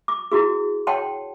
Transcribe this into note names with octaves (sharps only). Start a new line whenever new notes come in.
D6
E4 F#4 G#4
C#5 F#5 G5 A5 C6